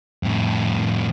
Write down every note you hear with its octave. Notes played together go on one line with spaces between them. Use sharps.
F2 A2